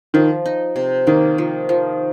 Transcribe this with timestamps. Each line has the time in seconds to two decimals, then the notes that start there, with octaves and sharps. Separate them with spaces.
0.14 D#3 F3
0.46 D#4
0.76 C3
1.07 D#3 A#3
1.38 F3
1.69 F3